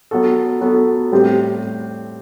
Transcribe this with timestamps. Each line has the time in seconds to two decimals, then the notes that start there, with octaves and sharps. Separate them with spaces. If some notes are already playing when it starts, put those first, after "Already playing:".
0.11 F#3 B3 F#4 A4
0.61 F#3 B3 F#4 A4
1.12 A2 G3 C4 G4